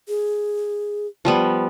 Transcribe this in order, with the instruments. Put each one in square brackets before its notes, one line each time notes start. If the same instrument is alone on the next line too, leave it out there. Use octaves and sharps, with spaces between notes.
[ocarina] G#4
[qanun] F3 G3 B3